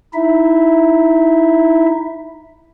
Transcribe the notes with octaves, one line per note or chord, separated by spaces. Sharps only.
D#4 E4 E5